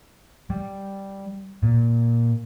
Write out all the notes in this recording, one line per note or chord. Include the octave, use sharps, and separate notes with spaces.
G3
A#2